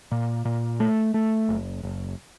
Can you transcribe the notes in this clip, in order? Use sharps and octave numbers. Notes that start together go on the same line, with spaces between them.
A#2
A#2
A3
A3
F#1
F#1